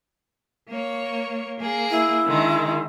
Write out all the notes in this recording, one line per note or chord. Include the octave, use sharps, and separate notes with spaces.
A#3 C#5
A#3 G#4
E4
D3 D#3 G#3